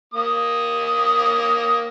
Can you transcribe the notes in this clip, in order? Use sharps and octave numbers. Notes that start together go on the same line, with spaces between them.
A#3 D#6